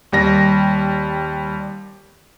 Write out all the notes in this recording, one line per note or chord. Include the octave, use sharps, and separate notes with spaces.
D#2 G3 A#6